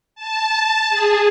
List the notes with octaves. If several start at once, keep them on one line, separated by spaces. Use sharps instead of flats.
A5
G#4